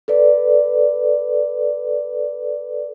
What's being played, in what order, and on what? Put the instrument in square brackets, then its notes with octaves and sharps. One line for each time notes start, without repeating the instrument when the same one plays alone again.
[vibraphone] A4 B4 D5